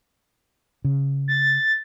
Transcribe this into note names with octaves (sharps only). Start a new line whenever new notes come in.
C#3
A6